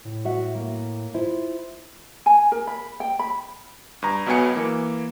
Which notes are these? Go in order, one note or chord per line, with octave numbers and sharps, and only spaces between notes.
A2
F#4 E5 F#5
A#3
E4 F4 C5
G#5
A#4
B5
G5
B5
G2 A#5
B1 B2 F#3 B3 G#5 C#7
E3 A#3